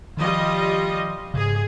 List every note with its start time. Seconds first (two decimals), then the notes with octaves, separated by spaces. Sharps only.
0.17 D#3 F3 G3 F4 D#5
1.34 G#2 C#3 G#4